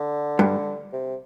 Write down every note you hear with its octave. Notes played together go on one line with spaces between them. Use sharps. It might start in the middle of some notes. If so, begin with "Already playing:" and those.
Already playing: D3
G2
C3